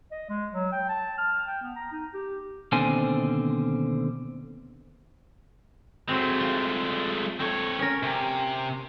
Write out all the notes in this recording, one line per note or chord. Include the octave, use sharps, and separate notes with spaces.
D#5
G#3
F#3
G5
A5
F6
G5
B3
A#5
D#4
G4
D#2 B2 D3 C4 C5 G#5
F#3 G#3 A3 C4
F4
A3 C4 C#5
C#4 A#4
C3